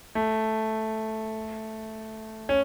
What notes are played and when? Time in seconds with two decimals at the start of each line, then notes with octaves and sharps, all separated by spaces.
0.15 A3
2.49 C#4